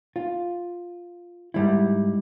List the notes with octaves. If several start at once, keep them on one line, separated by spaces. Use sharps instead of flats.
F4
G#2 G3 E4